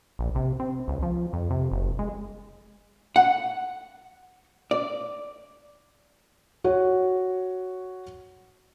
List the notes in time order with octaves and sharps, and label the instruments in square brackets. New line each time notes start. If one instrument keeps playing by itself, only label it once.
[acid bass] A#1
C3
C4
C#2
F3
F2
C3
F#1
G#3
[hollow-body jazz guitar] F#5
D5
[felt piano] F#4 C#5 F#5